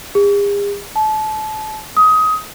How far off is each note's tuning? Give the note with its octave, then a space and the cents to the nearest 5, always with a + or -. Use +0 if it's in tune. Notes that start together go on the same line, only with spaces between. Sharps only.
G#4 -45
A5 -30
D#6 +20